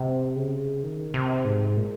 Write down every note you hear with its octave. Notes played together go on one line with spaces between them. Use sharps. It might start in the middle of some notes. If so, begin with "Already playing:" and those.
Already playing: C3
C#3
D#3
C3
G#2
A#2